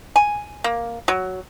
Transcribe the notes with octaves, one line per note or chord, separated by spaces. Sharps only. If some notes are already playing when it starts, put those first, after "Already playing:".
G#5
A#3
F#3